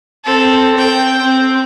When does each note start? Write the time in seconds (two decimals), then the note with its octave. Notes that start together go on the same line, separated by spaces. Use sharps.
0.24 C4 A4
0.75 C4 G5
1.22 C4